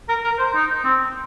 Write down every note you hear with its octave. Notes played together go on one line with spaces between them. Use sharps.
A#4
A#4
C5
D#4
C4